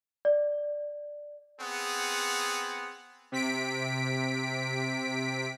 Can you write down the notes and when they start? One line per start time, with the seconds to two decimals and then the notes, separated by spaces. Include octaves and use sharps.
0.25 D5
1.61 B3 C4 G#4 F#5
3.32 C3 B6 D7